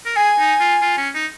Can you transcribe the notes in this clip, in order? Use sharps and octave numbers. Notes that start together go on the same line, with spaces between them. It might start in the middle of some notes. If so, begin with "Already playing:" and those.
A#4
G#4 G#5
D#4
F4
F4
C#4
D#4